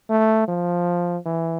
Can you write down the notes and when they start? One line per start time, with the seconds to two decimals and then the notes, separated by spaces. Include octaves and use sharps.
0.10 A3
0.48 F3
1.26 E3